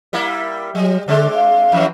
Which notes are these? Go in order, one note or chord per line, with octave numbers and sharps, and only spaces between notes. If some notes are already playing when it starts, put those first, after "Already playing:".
G3 A#3 E4
F#3 G3
D3 G#3 C4 D4
F5
F2 E3 F#3